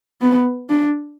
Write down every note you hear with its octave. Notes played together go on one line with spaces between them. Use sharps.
B3
D4